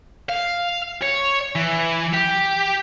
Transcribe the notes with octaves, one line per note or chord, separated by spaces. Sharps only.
F5
C#5
E3
G4